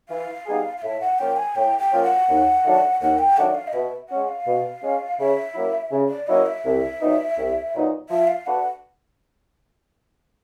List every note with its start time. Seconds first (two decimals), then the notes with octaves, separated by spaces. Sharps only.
0.09 E3 F5
0.46 G3 B3 D#4 G#4
0.77 F5
0.82 A2 E5
1.00 F#5
1.19 F3 A#3 C#4 F4 G5
1.37 G#5
1.55 A2 G5
1.79 G5
1.91 F3 A#3 C#4 F4
2.03 F#5
2.28 D#2
2.64 D#3 F#3 A3 D4
3.01 D#2 F#5
3.18 G5
3.37 D#3 F#3 A3 D4 F#5
3.55 F5
3.68 D#5
3.73 B2 E5
4.09 G#3 C#4 F#5
4.28 F5
4.46 B2
4.83 G#3 C#4
5.18 C#3 E5
5.55 F#3 A#3 C#4 E4
5.91 C#3
6.09 D5
6.27 F#3 A#3 C#4 E4 D#5
6.46 E5
6.64 C2
7.00 A#2 F#3 B3 D#4
7.37 C2
7.74 A#2 F#3 B3 D#4
8.09 F3 E5
8.27 F5
8.46 A3 D4 F#4 B4 F#5